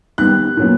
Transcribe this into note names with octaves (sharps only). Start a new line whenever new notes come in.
D#3 G3 B3 F#6
A#2 F#3 B3